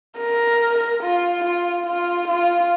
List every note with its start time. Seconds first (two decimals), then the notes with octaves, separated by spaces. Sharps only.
0.19 A#4
1.03 F4
1.45 F4
1.86 F4
2.28 F4